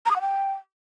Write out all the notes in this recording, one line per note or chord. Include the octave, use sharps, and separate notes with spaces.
A#5
D#6
F#5
G5